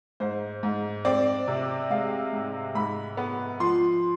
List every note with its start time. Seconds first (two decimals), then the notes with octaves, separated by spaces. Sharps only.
0.20 G#2 C5
0.63 G#2
1.05 C4 D5
1.48 C3
1.90 G#3 F5
2.33 G#2
2.75 G#2 B5
3.17 B3
3.60 F3 C6